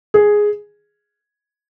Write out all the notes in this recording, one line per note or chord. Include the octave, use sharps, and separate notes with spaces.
G#4